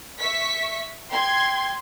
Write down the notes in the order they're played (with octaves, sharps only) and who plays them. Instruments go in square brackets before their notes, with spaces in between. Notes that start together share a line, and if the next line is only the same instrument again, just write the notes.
[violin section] E5 C#6 B6
[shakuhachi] G5 [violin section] C6 G#6